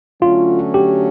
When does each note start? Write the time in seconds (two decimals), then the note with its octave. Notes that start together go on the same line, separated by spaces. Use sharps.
0.22 D3 F#3 A3 C#4 F4
0.74 G4